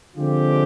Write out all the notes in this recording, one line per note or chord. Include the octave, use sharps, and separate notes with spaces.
D3 F3 G#3 C4 F4 G4